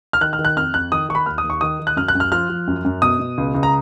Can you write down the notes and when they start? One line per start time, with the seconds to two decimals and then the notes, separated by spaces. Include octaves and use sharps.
0.13 F6
0.21 D#3 F#6
0.33 F6
0.39 D#3
0.45 F#6
0.57 F2 F6
0.74 F2 F#6
0.92 D#3 D#6
1.09 D#3 C#6
1.15 B5
1.26 D#2 F6
1.38 D#6
1.44 D#2
1.50 C#6
1.61 D#3 D#6
1.80 D#3
1.87 F#6
1.96 F#2 F6
2.08 F#6
2.15 F#2
2.20 F6
2.32 F3 F6
2.50 F3
2.67 F#2
2.85 F#2
3.02 B2 D#6
3.20 B2
3.38 C#2
3.55 C#2
3.63 A#5